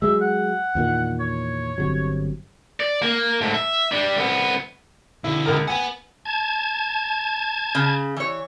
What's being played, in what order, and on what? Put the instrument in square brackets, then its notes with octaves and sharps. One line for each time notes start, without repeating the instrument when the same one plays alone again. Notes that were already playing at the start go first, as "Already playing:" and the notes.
[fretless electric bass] F#3 G#3 [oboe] E5
[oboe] F#5
[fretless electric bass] E2 A#2 D#3
[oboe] C#5
[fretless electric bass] G1 C3 F#3
[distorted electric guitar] D5
A#3
G#2 A3
E5
G3 D4
C2 B3
[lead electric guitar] B2 D3 [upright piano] E4
[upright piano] C#2 A#4
[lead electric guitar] B4 F#5 [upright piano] G#5
[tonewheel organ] A5 G#6
[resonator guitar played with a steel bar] C#3
E3 C#5